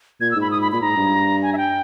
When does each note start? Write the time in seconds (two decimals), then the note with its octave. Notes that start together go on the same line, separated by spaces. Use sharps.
0.21 A#2 G#6
0.31 E6
0.36 G#2
0.41 B5
0.51 D#6
0.61 B5
0.72 A#2 B5
0.81 G#2 A#5
0.97 G2
1.42 G#5
1.53 E5
1.58 G5